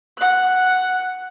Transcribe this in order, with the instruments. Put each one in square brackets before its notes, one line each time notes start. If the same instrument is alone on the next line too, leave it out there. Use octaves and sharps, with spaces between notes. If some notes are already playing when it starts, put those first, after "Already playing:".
[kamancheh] F#5 F#6